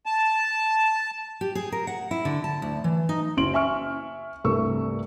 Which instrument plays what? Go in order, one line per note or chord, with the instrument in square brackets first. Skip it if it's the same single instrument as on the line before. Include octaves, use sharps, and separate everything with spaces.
[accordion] A5
[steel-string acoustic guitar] G4
G#4
A#4
F#5
E4
D3
A5
D2
E3
D#4
[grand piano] F#1 C#4 E4 C6 D7 F#7
E5 G#5 C#6 F6
C2 G2 A3 A#4 C#6 E6